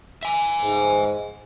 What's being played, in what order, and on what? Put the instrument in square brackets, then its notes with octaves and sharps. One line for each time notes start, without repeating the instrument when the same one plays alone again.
[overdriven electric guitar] E5 G#5
[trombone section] G#2